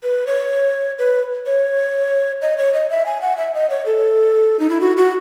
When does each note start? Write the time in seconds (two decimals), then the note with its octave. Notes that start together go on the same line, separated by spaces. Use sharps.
0.03 B4
0.27 C#5
0.99 B4
1.46 C#5
2.42 D#5
2.58 C#5
2.74 D#5
2.90 E5
3.06 G#5
3.22 F#5
3.38 E5
3.54 D#5
3.70 C#5
3.86 A4
4.60 D#4
4.70 E4
4.81 F#4
4.97 F#4